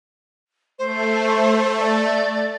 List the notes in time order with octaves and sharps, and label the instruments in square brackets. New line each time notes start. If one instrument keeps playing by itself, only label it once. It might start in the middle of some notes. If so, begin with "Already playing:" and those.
[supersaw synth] A3 [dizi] C5
[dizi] D5